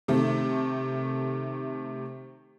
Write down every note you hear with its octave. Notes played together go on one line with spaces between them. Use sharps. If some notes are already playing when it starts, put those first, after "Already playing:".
C3 D#3 A3